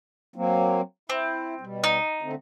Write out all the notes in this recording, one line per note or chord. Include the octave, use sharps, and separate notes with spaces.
F#3 A#3 C4
C4 E4
B2 G3
D#4
D3 A3 C4